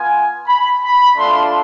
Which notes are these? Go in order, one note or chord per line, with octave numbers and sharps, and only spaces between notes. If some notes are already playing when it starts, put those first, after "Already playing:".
Already playing: B3 F4 G#5
B5
B5
A3 D4 F4 C6